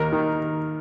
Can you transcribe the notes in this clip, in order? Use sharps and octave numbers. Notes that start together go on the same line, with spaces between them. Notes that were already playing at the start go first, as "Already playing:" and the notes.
Already playing: D#2 A#4
D#3